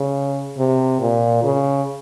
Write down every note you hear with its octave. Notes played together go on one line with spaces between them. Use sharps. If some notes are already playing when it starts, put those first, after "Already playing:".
Already playing: C#3
C3
A#2
C#3